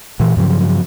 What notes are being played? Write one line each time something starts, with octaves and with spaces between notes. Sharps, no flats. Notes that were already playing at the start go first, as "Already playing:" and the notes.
A#2 E3
G2 C#3 F3 F#3